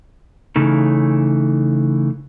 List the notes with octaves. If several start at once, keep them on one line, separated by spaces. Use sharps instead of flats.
C#3 E3 A3 D#4